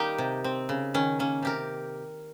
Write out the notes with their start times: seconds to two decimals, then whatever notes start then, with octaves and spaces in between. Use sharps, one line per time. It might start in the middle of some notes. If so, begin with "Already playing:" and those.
Already playing: D#3 G3 A#3 D#4 G4
0.18 C3
0.44 C4
0.69 C#3
0.94 D#3 C#4
1.19 A#3 C#4
1.42 C3 G4 A#4